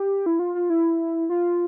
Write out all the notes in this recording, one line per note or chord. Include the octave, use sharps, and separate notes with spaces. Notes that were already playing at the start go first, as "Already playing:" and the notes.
Already playing: G4
E4
F4
F4
E4
F4